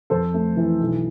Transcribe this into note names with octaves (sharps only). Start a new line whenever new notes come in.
F2 A4 C5
A3
E3
B1